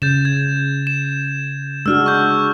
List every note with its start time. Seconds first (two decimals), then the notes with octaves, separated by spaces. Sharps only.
0.02 C#3 G6 A6 E7
0.25 G#6
0.87 E7
1.86 G#3 D4 F#4 E6 F6
2.06 C#6 G6